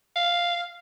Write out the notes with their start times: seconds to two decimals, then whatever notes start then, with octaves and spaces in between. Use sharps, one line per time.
0.16 F5